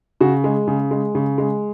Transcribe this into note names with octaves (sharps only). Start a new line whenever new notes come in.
C#3 F#4
G#3
C#3
G#3
C#3
G#3